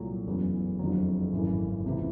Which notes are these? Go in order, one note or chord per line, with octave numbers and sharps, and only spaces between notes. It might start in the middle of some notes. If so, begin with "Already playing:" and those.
Already playing: C2 A#2 F#3 A3
F#1 E2 C#3 F#3 A3
F#1 F2 D3 F#3
G#1 F#2 C#3 E3 A3
C#2 C3 E3